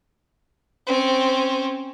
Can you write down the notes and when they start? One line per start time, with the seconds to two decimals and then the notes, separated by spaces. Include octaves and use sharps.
0.87 C4 C#4